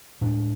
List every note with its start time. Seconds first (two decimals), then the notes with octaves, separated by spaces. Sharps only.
0.21 A2 G#3 D4